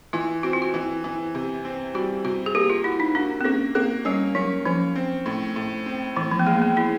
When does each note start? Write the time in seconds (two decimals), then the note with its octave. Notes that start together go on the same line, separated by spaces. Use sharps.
0.13 E3 F4
0.43 C4 F#4
0.53 F4
0.62 F#4
0.74 E3
1.04 E3
1.35 C3
1.65 C4
1.94 G3 F#4
2.25 C3 F#4
2.46 G#4
2.55 A#3 G4
2.70 F4
2.84 E4 F#4
3.00 D#4
3.15 D4 F#4
3.41 C4
3.45 A#3 C#4
3.75 A#3 C4
4.05 G3 C#4
4.35 F#3 C#4
4.65 F3 C#4
4.96 C4
5.26 A2
5.56 A2
5.86 C4
6.16 A2 E3
6.31 F3
6.39 B3
6.46 G#3 A#3
6.62 B3
6.76 G#3 E4